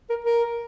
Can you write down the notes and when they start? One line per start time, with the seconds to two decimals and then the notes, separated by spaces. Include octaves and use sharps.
0.09 A#4
0.24 A#4